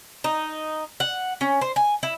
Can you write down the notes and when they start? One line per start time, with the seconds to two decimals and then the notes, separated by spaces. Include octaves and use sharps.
0.24 D#4
1.00 F#5
1.41 C#4
1.61 C5
1.76 G#5
2.03 E4